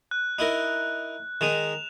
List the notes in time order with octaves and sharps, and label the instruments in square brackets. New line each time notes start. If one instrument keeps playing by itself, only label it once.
[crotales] F#6
[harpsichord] D#4 E4 A#4
[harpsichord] D#3 G#3 D#4 [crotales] E7 F7